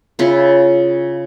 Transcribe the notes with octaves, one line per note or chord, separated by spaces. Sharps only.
C#3 E4 F4